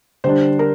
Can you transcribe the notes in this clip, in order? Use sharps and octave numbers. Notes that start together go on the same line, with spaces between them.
D3 G3 D4 C5
A#4